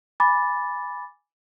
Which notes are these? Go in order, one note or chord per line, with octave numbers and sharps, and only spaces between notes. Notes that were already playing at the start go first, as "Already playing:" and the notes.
G#5 B5 D6 A6